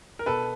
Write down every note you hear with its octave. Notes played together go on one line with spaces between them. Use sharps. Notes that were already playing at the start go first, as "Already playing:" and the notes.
A#4
B2 A4 B4